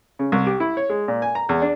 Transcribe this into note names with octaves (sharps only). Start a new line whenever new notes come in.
C#3
C2
G4
E4
C#5
G#3
A#2
G#5
A#5
E2
D4